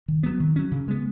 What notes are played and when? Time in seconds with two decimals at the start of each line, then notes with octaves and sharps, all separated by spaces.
0.08 D#3
0.23 F#3 B3
0.40 D#3
0.56 F#3 C#4
0.71 C#3
0.88 G#3 B3